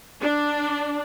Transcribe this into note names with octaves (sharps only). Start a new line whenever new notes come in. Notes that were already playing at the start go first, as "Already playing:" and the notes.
D4